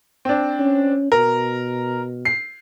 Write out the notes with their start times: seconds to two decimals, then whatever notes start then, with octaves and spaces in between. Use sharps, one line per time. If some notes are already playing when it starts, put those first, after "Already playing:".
0.25 C4 D4
0.60 C#4
1.12 B2 A#4
2.25 C7